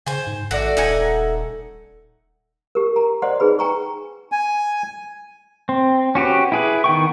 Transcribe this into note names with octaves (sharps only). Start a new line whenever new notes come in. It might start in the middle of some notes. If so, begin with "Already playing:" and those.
C#3 C5 G#5
G#2
A1 A3 F#4 A4 D5
D#1 D#4 F#5 G#5
G4 A#4
A#5
C5 D5 D#5 F#5 C6
D#4 G#4 B4 B5
G5 G#5 A#5 C#6
G#5
C4
C#4 F#4 G4 B4
E4 G#4 B4
D#3 B3 G5 C#6